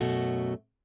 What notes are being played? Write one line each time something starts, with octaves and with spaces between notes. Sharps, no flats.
F#2 B2 A3 F#4